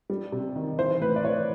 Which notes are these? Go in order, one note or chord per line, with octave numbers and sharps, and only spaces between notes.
G3
C3
D#3
E3 C5
A2 B4
D5
E3 C#5